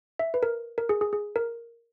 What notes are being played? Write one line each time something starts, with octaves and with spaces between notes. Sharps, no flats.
E5
B4
A#4
A#4
G#4
G#4
G#4
A#4